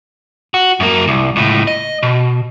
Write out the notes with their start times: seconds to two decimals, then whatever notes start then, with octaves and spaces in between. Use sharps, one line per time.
0.54 F#4
0.80 F#2 A#3
1.08 C2
1.36 C#2 A2
1.67 D#5
2.03 B2